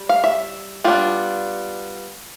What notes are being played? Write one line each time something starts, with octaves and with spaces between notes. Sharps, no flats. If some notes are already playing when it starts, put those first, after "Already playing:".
Already playing: G3
F5
E5
G3 B3 D4 F4